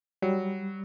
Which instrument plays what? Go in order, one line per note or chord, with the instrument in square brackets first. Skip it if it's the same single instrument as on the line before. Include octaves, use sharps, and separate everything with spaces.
[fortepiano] F#3 [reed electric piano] G3